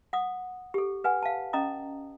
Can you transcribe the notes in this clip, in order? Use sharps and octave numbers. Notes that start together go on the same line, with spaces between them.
F#5 D#6
G4 A4
B4 F#5 G#5
F5 A5
C#4 D#5 A#5 D#6